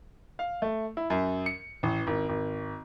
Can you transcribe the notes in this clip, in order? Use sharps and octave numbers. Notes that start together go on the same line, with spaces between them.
F5
A3
E4
F#2
C#7
A1
G#1
G#1